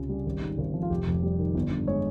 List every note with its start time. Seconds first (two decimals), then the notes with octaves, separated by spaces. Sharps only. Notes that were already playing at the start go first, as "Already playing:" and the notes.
Already playing: C#2 C3 C#4 F4
0.09 G3
0.26 G#1
0.41 G#2
0.58 G#1
0.74 F3
0.82 F4
0.90 F1 G4
1.07 F2
1.23 G3
1.39 D#3
1.55 G1
1.71 G2
1.87 G#3 C#5